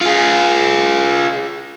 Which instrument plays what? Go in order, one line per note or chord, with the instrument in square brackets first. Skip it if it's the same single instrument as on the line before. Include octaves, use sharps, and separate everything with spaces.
[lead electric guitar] F4 G#4